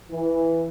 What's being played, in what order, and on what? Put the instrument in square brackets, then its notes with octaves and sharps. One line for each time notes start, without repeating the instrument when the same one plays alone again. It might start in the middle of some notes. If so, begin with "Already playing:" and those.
[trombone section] E3